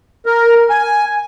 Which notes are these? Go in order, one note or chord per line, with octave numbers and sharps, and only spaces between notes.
A#4
G#5